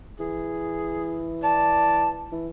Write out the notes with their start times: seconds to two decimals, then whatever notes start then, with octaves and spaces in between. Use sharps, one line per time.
0.20 E3 G#4
1.43 D5 A5
2.32 E3